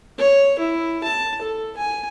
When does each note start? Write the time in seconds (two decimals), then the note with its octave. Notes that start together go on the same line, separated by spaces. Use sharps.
0.18 C#5
0.59 E4
1.04 A5
1.42 A4
1.77 G#5